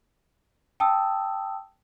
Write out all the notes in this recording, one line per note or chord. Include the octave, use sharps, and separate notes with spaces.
G5 A5 D#6 E6